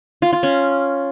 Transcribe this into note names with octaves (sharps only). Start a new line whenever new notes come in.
F4
F4
C#4